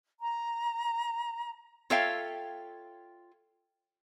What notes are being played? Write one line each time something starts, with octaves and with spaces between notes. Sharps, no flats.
A#5
F4 A4 C#5 E5 F5 G5